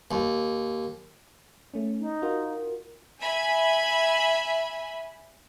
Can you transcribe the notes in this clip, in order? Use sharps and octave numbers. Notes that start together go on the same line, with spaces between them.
D#2
A3 C#4
D#4
F4 F#4 A#4
E5 G#5 B5